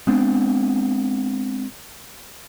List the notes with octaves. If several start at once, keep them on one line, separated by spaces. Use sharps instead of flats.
G#3 B3 C4 D4